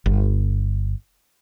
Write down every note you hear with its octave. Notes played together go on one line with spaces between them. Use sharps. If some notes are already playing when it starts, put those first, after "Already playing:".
G1